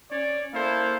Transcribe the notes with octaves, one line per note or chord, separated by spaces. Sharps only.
C#4 C#5 D5
A#3 E4 A4 C5 F5